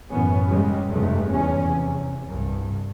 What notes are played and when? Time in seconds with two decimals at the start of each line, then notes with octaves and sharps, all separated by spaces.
0.11 F#1 F#2 A2 E3 B3 C#4
0.49 G#2 C#3 G3 G#3
0.91 F1 G2 C3 G#3 A3
1.31 E2 G2 C#4
1.68 C3
2.30 C2 G2